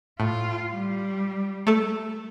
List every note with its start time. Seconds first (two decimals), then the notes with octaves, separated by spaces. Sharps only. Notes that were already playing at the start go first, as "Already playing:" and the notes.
0.20 A2 F4
0.73 G3
1.67 A3 A4